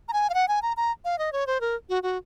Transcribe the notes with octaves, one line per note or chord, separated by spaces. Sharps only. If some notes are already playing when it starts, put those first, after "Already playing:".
A#5
G#5
F5
F#5
G#5
A#5
A#5
F5
D#5
C#5
C5
A#4
F#4
F#4